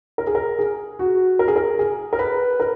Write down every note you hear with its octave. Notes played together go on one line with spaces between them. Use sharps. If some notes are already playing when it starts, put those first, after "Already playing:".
A#4
G#4
A#4
G#4
F#4
A#4
G#4
A#4
G#4
A#4
B4
A#4